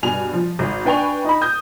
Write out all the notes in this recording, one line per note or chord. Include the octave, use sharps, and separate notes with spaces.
G2 B2 G#5 F7
F3
G#1
D4 B4 G5 G#5 C#6 F7
D#4 B5
D#6 G6